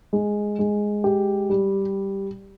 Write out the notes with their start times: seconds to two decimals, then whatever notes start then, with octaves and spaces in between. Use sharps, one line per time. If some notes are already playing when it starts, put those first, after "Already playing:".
0.13 G#3
0.59 G#3
1.04 G4
1.50 G3